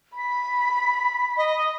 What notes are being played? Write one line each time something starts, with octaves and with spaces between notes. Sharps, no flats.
B5 B6
D#5